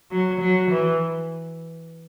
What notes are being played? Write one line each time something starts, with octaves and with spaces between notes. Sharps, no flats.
F#3
F#3
E3